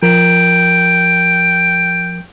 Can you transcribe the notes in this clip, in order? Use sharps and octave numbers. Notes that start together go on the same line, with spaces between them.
F3 A#4 G5